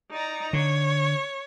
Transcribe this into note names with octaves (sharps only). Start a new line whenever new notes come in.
D#4 D5 A#5
D3 C#5